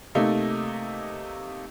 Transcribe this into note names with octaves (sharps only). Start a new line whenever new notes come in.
C3 A3 A#3 D#4